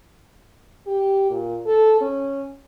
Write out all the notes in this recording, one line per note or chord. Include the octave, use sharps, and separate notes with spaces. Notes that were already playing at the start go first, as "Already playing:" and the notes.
G4
A#2
A4
C#4